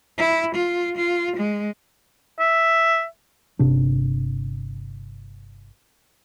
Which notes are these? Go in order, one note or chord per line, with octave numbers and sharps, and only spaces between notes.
E4
F4
F4
G#3
E5
G1 C3 C4 D4